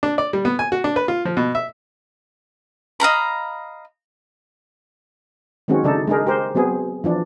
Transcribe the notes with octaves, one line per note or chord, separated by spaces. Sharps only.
D4
D5
G3
B3
G#5
F#4
D4
B4
F4
F3
B2
E5
D#5 F5 A#5 B5
D#3 F#3 G#3 C4 C#4 F#4
C#3 D4 D#4 A4
G#3 D4 D#4 G#4 A#4
G4 A#4 C5
F#3 B3 C4 G#4
E3 F3 D4